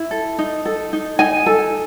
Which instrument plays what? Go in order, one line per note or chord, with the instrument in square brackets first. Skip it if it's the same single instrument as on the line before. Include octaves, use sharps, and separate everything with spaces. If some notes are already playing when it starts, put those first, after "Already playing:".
Already playing: [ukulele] E4
A4
D#4
A4
D#4
D#4 G#5
A4